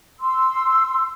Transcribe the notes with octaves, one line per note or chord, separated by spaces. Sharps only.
C6 E6